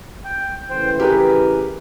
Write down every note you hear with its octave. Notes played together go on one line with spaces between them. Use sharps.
G5
A2 C#3 E3 C5 G5
G4 G#4 A#4 B4